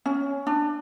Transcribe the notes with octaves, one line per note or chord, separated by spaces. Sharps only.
C#4
D4